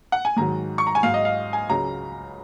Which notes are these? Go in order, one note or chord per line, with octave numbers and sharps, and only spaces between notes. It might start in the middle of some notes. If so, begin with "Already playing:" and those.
F#5
G#5
G#2 D#3 F#3 A#5
C#6
A#5
G#5
G#2 F#3 F5
D#5
F5
G#5
C#2 C#3 F#3 A#5